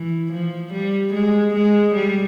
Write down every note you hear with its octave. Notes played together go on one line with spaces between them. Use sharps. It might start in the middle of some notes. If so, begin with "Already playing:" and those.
Already playing: E3
F3
G3
G#3
G#3
G3